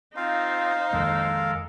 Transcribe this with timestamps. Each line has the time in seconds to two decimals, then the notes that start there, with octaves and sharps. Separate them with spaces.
0.16 C4 D#4 F4 C5 F5
0.93 F2 D#3 G#3 A#3 A4 A#4